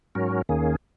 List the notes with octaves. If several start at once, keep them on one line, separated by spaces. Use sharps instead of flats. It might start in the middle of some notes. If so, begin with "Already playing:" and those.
G#2 F#3 C#4 F#4 A#4
D#2 D#3 A#3 C#4 G#4